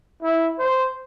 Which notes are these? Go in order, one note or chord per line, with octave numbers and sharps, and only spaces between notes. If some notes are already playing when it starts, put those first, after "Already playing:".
E4
C5